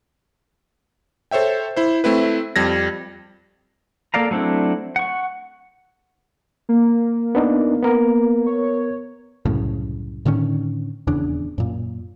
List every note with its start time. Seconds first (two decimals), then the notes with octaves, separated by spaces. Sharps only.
1.31 A4 C5 C#5 E5 G5
1.77 E4 C5
2.04 A3 C4 E4 B4
2.56 F2 G3 G#6 A#6
4.14 A#3 A4 D5 F5 A#5
4.31 F#3 A3 C4 D4 E4
4.96 F#5 C#6
6.69 A#3
7.35 B3 D4 D#4
7.83 B3 A#4
8.47 C#5
9.45 C2 F#2 A2 C#3
10.25 A2 D3 D#3 C#4
11.07 D#1 E2 C#3 D4
11.58 F#2 A#2